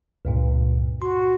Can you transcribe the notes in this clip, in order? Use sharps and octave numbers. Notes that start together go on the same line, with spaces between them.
C#2 G2 A#2
F#4 C6